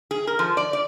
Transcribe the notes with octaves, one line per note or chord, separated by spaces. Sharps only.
G#4
A#4
F3
D5
D5